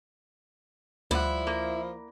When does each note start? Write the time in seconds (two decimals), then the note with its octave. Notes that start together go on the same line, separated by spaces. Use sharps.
1.11 D2 F3 G3 E4 F#5
1.47 A#3